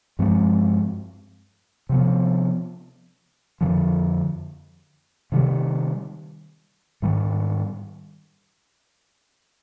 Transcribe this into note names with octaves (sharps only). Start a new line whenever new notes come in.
G2 F3 G#3 C4
C3 F3 B3
F2 D3 F3
C3 D#3 G3
G#2 D#3 G3